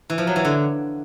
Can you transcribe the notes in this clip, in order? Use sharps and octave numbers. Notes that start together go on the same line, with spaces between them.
E3
F3
F#3
E3
D3